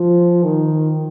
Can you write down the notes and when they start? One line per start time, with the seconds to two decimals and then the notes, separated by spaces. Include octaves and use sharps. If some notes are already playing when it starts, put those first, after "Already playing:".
Already playing: F3
0.43 D#3